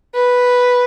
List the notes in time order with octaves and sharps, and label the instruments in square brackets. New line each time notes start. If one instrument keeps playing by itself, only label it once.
[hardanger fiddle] B4